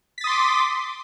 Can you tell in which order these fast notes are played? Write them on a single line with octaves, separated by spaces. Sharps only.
B6 A6 D#6 C6 D6